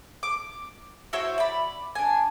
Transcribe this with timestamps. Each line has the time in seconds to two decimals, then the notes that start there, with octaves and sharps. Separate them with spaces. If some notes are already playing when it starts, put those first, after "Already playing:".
0.23 D6
1.13 E4 F#4 C5 C#5
1.38 D5 B5
1.95 D4 G#5